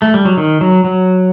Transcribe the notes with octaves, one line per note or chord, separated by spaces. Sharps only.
A3
G3
F#3
D#3
F#3
F#3